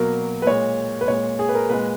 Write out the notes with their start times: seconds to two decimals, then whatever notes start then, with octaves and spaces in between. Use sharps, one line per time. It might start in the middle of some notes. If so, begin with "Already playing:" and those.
Already playing: B2 F#3 A#3 A#4
0.42 B4
0.46 A#2 G#3 C#5
1.01 B4
1.08 A#2 G#3 C#5
1.39 G#4
1.49 B4
1.54 A#4
1.69 A#2 G#3 B4